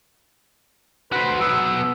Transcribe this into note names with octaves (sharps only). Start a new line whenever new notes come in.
F#4 B4 C5
F#3 B3 E6